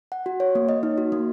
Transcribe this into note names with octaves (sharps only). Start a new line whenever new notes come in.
F#5
F#4
C#5
A#3
D#5
D#4
F#4
A#3